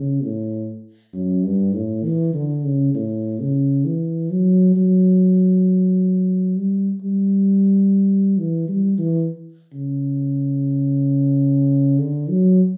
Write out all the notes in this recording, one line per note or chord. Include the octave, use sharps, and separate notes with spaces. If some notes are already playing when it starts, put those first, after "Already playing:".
Already playing: C#3
A2
F#2
G2
A2
E3
D3
C#3
A2
C#3
E3
F#3
F#3
G3
G3
E3
G3
E3
C#3
D3
F#3